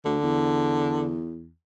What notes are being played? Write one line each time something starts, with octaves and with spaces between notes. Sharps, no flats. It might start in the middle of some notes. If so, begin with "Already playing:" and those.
D2 D3
E2